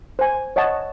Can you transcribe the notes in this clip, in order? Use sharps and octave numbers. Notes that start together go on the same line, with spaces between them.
C5 G#5
C#5 D#5 F#5 A5